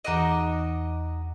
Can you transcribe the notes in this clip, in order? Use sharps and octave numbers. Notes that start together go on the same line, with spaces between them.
E2 D#4 F#4 D#5 D6